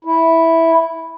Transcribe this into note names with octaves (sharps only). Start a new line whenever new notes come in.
E4